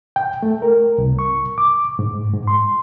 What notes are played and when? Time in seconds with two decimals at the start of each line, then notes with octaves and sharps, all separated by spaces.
0.16 G5
0.43 A3
0.62 A#4
0.98 C2
1.19 C#6
1.58 D6
1.99 G#2
2.34 G#2
2.47 C6